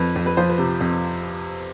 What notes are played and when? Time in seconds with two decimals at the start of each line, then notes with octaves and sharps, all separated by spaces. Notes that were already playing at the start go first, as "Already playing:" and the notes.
Already playing: F2 B4
0.16 F2
0.26 B4
0.37 F3 C5
0.50 B4
0.58 C3
0.81 F2